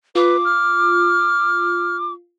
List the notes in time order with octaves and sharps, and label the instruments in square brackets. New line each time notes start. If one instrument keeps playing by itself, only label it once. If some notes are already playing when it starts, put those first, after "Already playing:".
[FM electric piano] F4 [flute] B4 [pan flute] D6
[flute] F6